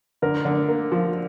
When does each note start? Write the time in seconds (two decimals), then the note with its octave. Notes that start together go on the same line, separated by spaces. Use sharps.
0.22 D3 A#4
0.45 D3
0.69 A#3
0.92 F3